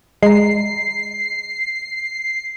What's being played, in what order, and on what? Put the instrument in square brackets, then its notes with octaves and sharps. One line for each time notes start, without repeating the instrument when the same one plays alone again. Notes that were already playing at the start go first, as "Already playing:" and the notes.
[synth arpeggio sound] G#3 A#5 [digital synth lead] C7